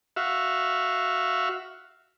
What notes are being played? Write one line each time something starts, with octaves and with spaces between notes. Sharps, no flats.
F#4 E5 F5